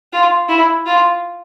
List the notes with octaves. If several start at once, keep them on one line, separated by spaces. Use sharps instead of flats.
F4
E4
F4